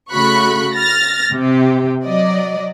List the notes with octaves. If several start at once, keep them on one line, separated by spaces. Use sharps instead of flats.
C#3 A3 F#4 B5 C#6 F#6
F6 A6 A#6
C3 G4
F#3 D5 D#5